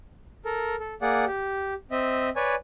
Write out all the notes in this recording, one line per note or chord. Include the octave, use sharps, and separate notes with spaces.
A4 A#4
A4
A#3 G#4 D5 F#5
G4
C4 D#5 E5
B4 C#5 D5 G#5